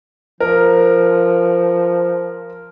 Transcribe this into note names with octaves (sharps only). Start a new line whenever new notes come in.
F3 A#4